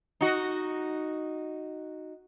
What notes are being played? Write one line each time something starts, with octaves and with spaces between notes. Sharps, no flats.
D#4 F#4